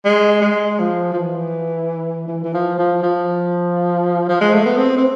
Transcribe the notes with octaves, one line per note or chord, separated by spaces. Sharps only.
G#3
G#3
F3
F3
E3
E3
E3
F3
F3
F3
F3
G#3
A3
B3
C4
C4